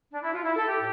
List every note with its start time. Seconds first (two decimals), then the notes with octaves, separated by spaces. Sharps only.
0.12 D4
0.23 E4
0.34 F4
0.44 E4
0.57 A4
0.66 G4
0.78 A2